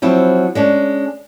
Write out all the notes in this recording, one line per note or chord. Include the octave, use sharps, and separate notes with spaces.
F3 F#3 C4 E4
G#3 C#4 D4